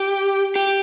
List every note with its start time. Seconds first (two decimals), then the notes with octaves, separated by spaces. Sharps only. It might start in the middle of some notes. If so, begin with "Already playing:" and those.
Already playing: G4
0.56 G4